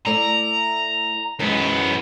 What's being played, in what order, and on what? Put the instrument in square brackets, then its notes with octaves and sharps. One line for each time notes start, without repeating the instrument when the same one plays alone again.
[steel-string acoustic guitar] A3 E4 D5 [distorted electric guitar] A#5
[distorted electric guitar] F#2 B3 [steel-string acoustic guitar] E3 G#3